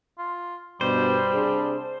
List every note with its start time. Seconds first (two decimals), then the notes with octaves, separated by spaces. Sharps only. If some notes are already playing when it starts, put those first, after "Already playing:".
0.19 F4
0.81 G2 B2 G3 C5
1.33 C3 D4 G#4